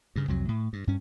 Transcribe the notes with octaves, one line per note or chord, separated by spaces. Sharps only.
G2 C#3
C2 F2 F#3
A2
G2
G2 C#4